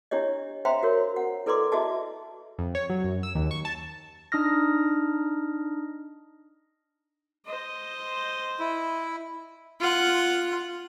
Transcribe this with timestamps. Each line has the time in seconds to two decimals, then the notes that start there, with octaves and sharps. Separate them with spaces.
0.11 D4 E4 G4 C#5 D#5
0.65 C5 E5 F5 G5 A#5 C6
0.83 F#4 A#4 C#5
1.16 F#5
1.46 E4 A4 B4 D5 C6 D6
1.72 E4 F#4 G#4 D#5 E5 A5
2.58 F2
2.75 C#5
2.90 F#3
3.04 F#2
3.23 E6
3.35 D#2
3.51 C#6
3.65 A5
4.32 D4 D#4 D#6 F6 A#6
7.46 C5 D#5
8.59 E4
9.80 F4 F#5